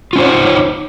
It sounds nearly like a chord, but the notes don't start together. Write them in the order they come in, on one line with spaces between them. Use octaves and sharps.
F4 C#4 C5 C#5 D#4